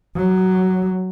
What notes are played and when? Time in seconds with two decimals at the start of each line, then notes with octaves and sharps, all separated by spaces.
0.16 F#3